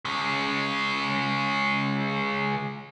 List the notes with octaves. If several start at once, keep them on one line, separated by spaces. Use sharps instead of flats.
C#3 G#3